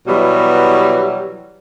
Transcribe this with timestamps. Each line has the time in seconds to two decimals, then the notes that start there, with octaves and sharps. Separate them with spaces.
0.07 B2 E3 F#3 G3